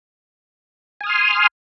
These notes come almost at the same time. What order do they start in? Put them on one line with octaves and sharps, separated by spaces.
G#5 D#6 F6 C6